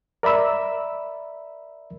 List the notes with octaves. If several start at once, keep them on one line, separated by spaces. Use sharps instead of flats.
A#4 D5 E5 B5 E6